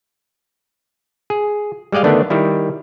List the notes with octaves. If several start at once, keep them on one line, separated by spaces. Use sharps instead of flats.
G#4
G3 G#3 D5 D#5 F5
D3 D#3 A3 B3 D4
D#3 G3 E4